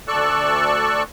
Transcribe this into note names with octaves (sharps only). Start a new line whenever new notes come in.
D2 A4 D5 C#6 E6 F#6